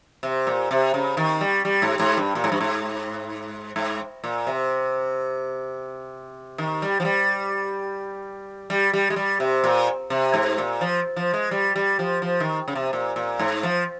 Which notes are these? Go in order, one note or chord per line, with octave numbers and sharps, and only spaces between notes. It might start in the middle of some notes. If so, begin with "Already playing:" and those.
C3
A#2
C3
C#3
D#3
G3
G3
G#2
G#2
G2
A#2
G#2
G2
G#2
G#2
A#2
C3
D#3
G3
F3
G3
G3
G3
G#3
G3
C3
A#2
C3
G#2
A#2
F3
F3
G#3
G3
G3
F3
F3
D#3
C#3
C3
A#2
A#2
G#2
F3